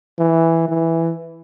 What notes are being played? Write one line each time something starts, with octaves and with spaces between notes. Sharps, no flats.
E3
E3